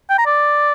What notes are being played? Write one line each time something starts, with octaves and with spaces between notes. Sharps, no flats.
G5
A#5
D5